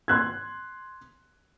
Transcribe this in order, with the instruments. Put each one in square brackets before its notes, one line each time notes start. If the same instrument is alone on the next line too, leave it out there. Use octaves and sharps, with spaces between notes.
[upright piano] C6 F#6 G#6